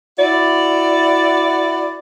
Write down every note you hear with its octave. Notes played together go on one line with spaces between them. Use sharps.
E4 F#4 D5